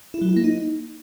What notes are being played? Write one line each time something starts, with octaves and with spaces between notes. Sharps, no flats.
E4
F#3
E4
A#3
D#4